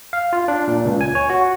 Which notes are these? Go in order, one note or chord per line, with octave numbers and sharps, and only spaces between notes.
F5
F4
D4
A#2
C#2
G#5
C#5
F#4